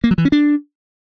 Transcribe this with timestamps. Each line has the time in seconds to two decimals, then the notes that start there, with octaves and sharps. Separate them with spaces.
0.04 A#3
0.11 F#3
0.18 E3
0.25 C#4
0.32 D4